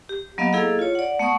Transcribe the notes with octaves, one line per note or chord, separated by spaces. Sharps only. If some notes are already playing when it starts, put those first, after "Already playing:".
G4
F#3 A#3 B3 D#5 F5
A#3 E4 G#4 A4 D#5 F5
F4 C#5
D5 F#5
A3 B3 F#5 C#6 D#6